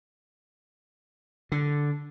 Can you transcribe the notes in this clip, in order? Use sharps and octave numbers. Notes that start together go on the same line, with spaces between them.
D3